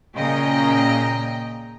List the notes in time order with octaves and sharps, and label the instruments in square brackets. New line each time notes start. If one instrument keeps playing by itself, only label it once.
[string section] A#2 C#3 D#5 G5 A#5